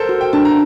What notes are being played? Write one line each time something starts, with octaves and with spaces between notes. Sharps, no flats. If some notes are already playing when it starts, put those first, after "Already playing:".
Already playing: A4 A#4 C5
F#4
G5
D4 A5
A#5